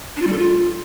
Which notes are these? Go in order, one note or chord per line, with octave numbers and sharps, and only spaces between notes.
D4
F4
G3
A4
F4